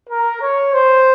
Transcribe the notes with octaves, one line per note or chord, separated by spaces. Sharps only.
A#4
C#5
C5